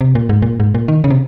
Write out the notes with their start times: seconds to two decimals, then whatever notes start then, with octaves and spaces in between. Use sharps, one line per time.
0.01 C3
0.15 A#2
0.29 G#2
0.42 A#2
0.60 G#2
0.75 A#2
0.88 D#3
1.04 C#3
1.10 C3